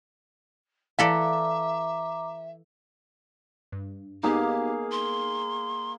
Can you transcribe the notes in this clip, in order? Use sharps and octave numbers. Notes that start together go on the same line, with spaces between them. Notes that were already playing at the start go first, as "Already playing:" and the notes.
E3 A4 D5 E5 F5 A#5 D6
G2
A#3 B3 D#4 G4 G#4 F5
C6